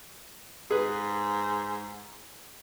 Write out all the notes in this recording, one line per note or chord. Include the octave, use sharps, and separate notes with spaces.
G#2 G#4 B4